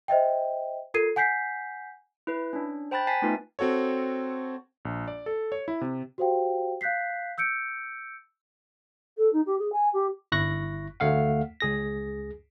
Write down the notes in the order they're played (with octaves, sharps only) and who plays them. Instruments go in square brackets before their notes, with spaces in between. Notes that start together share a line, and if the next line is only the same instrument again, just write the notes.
[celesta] C5 D#5 E5 G5
F4 A4 A#4 G#6 C7 D#7
F#5 G#5 G6 B6 C7
[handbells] E4 B4
C#4 D4
C5 G5 A5 B5 F#6 A6
G#5 A5 A6 B6 C7
A3 B3 D#4 F4 B4
[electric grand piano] C4 F#4 A4 C#5
A#1
D5
A4
C#5
E4
C3
[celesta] F#4 G4 C5 F5 G5
F5 F#6 G6 B6 C7
E6 G6 C#7 D7
[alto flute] A4
D#4
G4
G#4
G#5
G4
[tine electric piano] G1 E4 C#6 F#6 A#6
D2 A3 F5 F#5
C#2 G#4 A#6